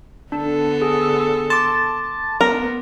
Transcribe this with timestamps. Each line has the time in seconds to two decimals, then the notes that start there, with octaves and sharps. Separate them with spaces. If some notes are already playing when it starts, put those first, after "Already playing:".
0.32 D3 B3 D4 A4
0.82 G#4
1.50 A5 C6 D6
2.41 B3 A#4